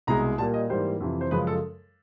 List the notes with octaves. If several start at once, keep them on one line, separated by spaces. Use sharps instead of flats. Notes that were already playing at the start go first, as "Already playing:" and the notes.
C2 B2 G#3 A#5
A#2 G3 A#3 A5
D#5
G#2 E3 G3 A#3 C5
F2 C3 E3
C5
F#2 C#3 F3 G#3 B4
A4